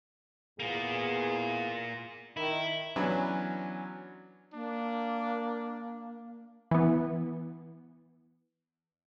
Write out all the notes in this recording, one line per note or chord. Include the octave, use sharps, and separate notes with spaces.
E2 A#3 B3 F4 G#4
D#3 E4
E3 F#3 B3 C#4 D4
A#3 D4
E3 B3